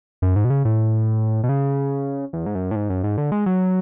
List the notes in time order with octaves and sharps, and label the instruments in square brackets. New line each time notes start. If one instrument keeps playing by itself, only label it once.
[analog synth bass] F#2
G#2
B2
C#3
A2
B2
C#3
E2
G#2
F#2
A2
G#2
F#2
G#2
D3
G#3
F#3